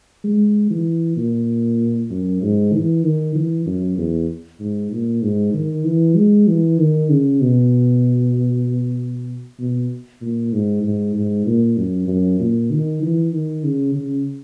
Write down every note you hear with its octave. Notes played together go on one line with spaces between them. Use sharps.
G#3
E3
A#2
F#2
G#2
E3
D#3
E3
F#2
E2
G#2
A#2
G#2
D#3
E3
G#3
E3
D#3
C#3
B2
B2
A#2
G#2
G#2
G#2
A#2
F#2
F#2
A#2
D#3
E3
D#3
C#3
C#3